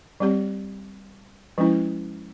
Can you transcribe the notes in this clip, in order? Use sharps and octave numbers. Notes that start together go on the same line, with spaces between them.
G3 C4 G4 C#5
F3 G#3 C#4 E4